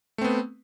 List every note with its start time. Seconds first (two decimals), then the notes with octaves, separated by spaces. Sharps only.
0.18 A3
0.21 C4
0.24 B3